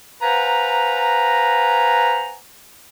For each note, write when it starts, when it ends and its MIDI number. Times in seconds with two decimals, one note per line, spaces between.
0.22 2.34 71
0.22 2.34 72
0.22 2.34 77
0.22 2.34 78
0.22 2.34 80
0.22 2.34 82